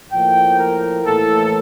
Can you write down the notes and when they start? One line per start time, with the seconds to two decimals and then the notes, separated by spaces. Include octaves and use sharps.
0.11 A2 F3 A#3 G5
0.59 A#4
1.05 A2 E3 A#3 A4